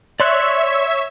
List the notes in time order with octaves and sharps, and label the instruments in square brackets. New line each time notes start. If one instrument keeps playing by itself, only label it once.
[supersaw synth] C#5 E5 [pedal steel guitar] D5 C6 F#6